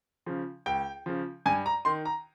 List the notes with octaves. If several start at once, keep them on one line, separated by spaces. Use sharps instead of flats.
C#3 F3
C#2 G5
C#3 F3
G2 G#5
A#5
D#3 C6
A#5